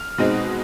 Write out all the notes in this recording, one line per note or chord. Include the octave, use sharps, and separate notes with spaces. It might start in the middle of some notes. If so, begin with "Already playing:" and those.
Already playing: F6
B2 G#3 C4 D#4